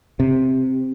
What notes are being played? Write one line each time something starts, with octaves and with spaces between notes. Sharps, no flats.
C3